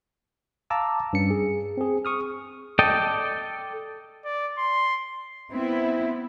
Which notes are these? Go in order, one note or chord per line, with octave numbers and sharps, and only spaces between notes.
F5 A5 A#5 D6 E6
G2 C#4 C#7
G#4
C4 G#4
C#6 D#6 F6
A4 D5 D#5 G5
D5
C6
B3 C4 E4